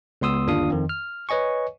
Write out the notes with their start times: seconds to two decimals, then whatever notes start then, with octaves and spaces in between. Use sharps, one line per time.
0.21 C#2 B3 C6 D#6 E6
0.47 G1 D#2 D4 F4 F5 D#6
0.70 F2 D#3
0.89 F6
1.29 B4 C#5 D#5 G#5 C#6